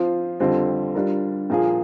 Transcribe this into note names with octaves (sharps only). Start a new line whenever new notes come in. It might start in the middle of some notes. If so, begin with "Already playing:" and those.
Already playing: F3 C4 F4 C5
F2 D3 G3 C4 F4
G3 D4 F4 A#4
A#2 F3 A#3 F4 G#4